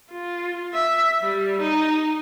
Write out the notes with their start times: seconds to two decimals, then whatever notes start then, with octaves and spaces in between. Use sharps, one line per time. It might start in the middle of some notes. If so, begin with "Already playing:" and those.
0.11 F4
0.74 E5
1.22 G3
1.62 D#4